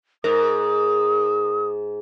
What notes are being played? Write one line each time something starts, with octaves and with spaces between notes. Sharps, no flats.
G#2 A#4 D#6